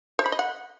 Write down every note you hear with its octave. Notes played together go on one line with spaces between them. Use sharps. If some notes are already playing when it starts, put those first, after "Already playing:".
C5
B5
D#5
F#5